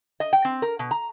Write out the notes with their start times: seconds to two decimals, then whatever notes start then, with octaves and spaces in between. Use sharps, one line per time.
0.20 D#5
0.33 G5
0.45 C4
0.62 A#4
0.79 B2
0.91 A#5